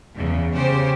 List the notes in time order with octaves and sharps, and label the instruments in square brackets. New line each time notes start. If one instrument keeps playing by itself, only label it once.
[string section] E2 C#3
C#3 G4 C5